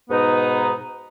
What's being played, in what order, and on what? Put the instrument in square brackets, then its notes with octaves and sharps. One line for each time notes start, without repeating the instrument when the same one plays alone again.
[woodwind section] G#2 B2 B3 D#4